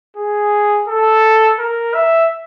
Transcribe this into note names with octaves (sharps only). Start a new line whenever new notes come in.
G#4
A4
A#4
E5